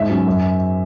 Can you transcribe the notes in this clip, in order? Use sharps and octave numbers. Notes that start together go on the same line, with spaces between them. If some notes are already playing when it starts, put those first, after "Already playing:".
Already playing: G#2 E5
F#3 C#4
F#2